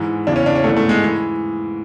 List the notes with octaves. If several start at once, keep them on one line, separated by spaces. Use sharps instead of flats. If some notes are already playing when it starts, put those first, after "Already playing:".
Already playing: G#2 E3
E2 C#3 E3 D4
C#4
D4
C#4
G#2 E3 A3
A3
G#3
E3